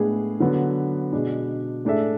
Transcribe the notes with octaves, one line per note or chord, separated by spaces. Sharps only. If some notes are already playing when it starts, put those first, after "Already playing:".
Already playing: A2 G#3 B3 D4 G#4
D3 F#3 B3
B2 G#3 D4
A2 G#3 D4 A4 E5